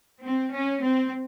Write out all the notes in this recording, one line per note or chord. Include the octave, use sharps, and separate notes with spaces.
C4
C#4
C4